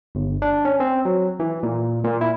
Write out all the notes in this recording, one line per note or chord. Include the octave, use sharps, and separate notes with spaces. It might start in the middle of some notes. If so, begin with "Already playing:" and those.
G1
D4
C#4
C4
F#3
E3
A#2
A#2
E4